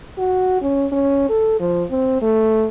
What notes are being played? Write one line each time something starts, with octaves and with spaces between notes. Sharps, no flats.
F#4
C#4
C#4
A4
F3
C4
A3